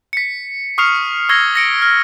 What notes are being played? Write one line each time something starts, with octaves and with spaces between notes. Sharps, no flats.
B6 C#7
C#6 D#6 F6 C7 C#7 F7
C#6 E6 G#6 A#6 C7 G7
A#6 C#7 D7
F6